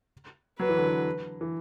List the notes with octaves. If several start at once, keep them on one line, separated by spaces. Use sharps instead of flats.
F#3 B4
E3
D3
E3
E3